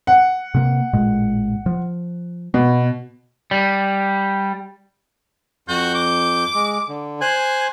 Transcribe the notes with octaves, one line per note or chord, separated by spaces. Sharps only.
F#5
C3 A#3
A1 A#2 G#3
F3
B2 B3
G3
F2 F#4 G6
D6
G#3
D3
C5 G#5 F#6